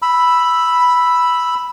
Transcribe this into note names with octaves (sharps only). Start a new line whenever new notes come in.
B5 E6